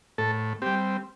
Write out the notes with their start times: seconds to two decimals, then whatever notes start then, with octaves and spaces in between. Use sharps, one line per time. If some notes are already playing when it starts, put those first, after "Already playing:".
0.18 A2 A4
0.62 G3 C4 G4